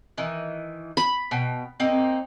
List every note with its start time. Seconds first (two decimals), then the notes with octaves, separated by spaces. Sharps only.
0.18 D#3 E3
0.97 B5
1.31 B2 G5
1.80 A#3 C4 D#4